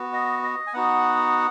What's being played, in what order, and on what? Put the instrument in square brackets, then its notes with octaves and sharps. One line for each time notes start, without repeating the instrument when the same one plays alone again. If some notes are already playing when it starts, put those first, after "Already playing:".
Already playing: [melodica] B3 F#4
D#5
D#5
G#5
B3 D#4 F#4 F#5